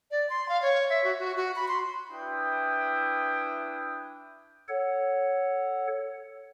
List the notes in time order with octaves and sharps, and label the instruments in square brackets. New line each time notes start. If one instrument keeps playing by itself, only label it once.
[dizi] D5
C6
F5
C#5
E5
F#4
F#4
F#4
B5
C6
[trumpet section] D4 E4 B4 G5 D#6
[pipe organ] A4 C#5 F#5